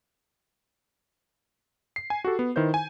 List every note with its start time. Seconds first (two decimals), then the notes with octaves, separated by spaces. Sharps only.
1.96 C7
2.10 G#5
2.24 F#4 G4 A4
2.39 B3
2.56 D#3 E4 B4 C5 G6
2.74 G#5